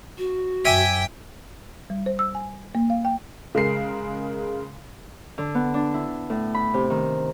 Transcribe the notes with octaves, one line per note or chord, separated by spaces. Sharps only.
F#4
F#2 E5 G5 G#5 D6
G3
C5
E6
G#5
A#3
F5
G5
C#3 G#3 A#4 C7
D3
B3
D4
E4
A2
B5
C3
D#3